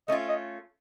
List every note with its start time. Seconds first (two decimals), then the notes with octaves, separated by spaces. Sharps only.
0.08 A3 C#4 F4 D#5
0.29 D#5